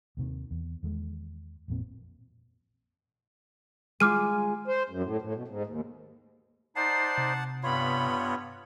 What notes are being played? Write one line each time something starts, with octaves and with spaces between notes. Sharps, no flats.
D#2 C3 D#3
E2
E2 D#3 G#3
A1 F2 A#2 C4
G#3 F4 D6 F6 D#7
C5
F#2
A2
A2
B2
G#2
D#2
D#4 C5 D5 F#5 A5 C7
C3
G2 B3 F4 C#5 B5